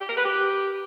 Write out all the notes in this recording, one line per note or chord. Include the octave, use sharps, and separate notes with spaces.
G4
A#4
B4
G4